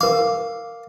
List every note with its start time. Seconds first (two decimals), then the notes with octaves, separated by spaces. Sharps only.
0.01 A#4 F5 D6